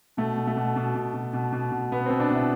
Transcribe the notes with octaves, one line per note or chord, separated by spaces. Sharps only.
B2 A3
B2
A3
B2
B2
B2
B2
B2
B2
B2
B2 B3
C4
B2
D4
B2 E4